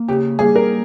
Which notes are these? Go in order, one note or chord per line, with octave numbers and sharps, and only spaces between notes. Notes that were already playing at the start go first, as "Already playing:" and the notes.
Already playing: A#3
C#3 G4
G3 A#3 G#4
A#4